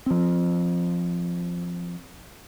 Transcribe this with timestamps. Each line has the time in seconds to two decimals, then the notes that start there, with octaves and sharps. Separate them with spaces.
0.06 F3 C4